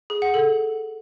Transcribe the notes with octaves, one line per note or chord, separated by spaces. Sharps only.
G#4
F#5
A4